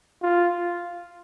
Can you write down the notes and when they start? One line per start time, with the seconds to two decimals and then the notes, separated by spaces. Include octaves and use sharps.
0.22 F4